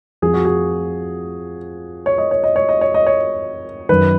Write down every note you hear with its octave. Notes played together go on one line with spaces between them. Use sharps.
F2 F3 G#4
F#4
G#4
C#5
D#5
C#5
D#5
C#5
D#5
C#5
D#5
C#5
F#2 D#3 B4